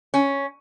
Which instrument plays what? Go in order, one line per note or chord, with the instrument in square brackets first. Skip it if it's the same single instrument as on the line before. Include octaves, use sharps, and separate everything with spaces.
[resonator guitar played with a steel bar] C#4